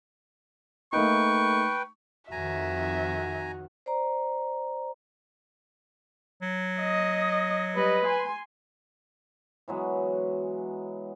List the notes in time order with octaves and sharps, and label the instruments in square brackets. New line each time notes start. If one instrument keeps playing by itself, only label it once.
[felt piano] A3 A#3 D#4 [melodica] B4 G5 [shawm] C#6
[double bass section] F2 D#3 [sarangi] F#4 [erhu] E5 [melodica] G#5 A#5
[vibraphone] C5 D5 A#5
[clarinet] F#3
[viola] D#5
[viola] G3 D#5 [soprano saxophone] B4
[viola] G#5 C6
[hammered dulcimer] E3 F#3 G#3 B3